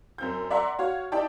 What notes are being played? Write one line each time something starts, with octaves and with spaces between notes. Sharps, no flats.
F#2 C4 G6
D5 E5 F#5 A#5 C6
F#4 C#5 F5
D#4 E4 G4 D5 G5 A5